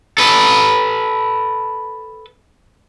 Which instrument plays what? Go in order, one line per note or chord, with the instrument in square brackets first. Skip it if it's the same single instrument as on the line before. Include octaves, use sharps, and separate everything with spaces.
[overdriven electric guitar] A4 B4